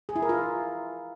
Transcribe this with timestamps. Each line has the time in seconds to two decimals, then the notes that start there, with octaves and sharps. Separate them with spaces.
0.09 G#4
0.16 E4
0.22 A#4
0.29 F4